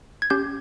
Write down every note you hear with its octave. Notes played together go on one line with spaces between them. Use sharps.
G#6
C#4 G4 G6